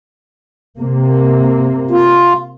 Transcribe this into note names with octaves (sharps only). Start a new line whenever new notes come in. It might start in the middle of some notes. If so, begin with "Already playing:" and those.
C3 A#3
F4